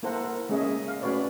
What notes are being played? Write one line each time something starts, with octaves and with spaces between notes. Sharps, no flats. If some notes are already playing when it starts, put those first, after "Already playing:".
A#3 E4 A4 C5 F#5 A#5
A#4
G#3 A#3 C#4 G#4 D#5 E5
F5
A3 C#4 F#4 B4 C#5 D5